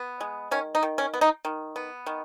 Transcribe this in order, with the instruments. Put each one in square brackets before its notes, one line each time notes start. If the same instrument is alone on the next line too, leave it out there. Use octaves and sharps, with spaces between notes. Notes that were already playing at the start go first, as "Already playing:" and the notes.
Already playing: [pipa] B3
G#3
D#3 C#4
D#4
D#3
C#4
B3
D#4
D#3
B3
D#3